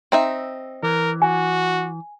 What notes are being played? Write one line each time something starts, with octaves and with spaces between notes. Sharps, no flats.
C4 D#4 E5
E3 A#4
F#4 G#5